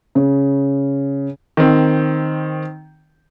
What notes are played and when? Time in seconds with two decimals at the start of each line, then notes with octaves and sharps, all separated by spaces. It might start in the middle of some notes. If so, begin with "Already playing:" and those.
0.15 C#3
1.57 D#3 C4